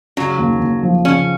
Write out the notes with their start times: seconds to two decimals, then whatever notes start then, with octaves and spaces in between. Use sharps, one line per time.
0.17 C#3 F#3
0.39 D#2
0.60 D#2
0.83 F3
1.05 C#3 C#4